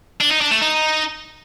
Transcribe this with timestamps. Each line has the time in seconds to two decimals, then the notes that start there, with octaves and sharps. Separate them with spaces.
0.21 D4
0.31 D#4
0.41 D4
0.51 A3
0.62 D#4